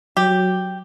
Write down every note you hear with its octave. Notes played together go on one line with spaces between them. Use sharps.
F#3 G4